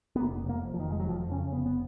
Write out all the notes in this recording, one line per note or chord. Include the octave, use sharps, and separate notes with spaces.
B3
F1 A#3
F1
A#3
F2
F3
D#3
F1
G#3
F#3
F2 F3
C#3 C#4
F1 B3
B3